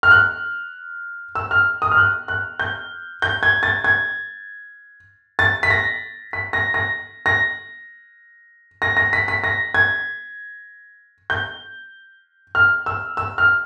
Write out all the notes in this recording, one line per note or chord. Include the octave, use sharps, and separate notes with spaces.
F6
F#6
E6
F6
D#6
F6
F#6
F#6
G6
G6
G#6
A6
G#6
A6
B6
A#6
B6
A#6
A#6
A#6
A#6
A#6
B6
B6
A#6
G#6
G6
F6
E6
E6
F6